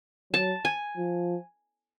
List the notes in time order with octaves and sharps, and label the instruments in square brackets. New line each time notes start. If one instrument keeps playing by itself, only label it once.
[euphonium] F#3 [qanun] A5
[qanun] G#5
[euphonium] F3